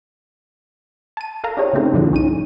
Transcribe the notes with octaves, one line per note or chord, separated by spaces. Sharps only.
A5 D#7
A4 A#4 F5 A#5
D4 E4 G4 G#4 C#5
C#3 A3 A#3 C4 D#4
G2 A#2 D3 E3 F3 G#3
C2 C#4 D#4 D#7